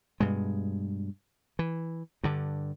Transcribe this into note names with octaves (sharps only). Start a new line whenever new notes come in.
G2 B2 G#3
E3
G2 D3